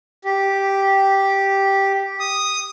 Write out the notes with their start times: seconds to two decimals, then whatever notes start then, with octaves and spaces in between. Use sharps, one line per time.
0.24 G4
2.20 D#6